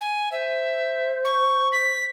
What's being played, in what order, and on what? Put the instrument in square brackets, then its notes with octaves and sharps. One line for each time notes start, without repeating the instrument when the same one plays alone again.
[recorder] G#5
[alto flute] C5 [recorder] E5
[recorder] C#6
B6